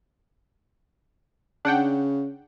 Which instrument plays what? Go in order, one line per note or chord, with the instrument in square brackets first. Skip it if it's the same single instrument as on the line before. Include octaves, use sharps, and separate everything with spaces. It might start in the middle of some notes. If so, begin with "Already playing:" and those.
[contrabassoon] C#3 [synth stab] D4 F#5 G5